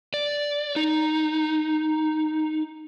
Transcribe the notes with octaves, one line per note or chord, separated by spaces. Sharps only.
D5
D#4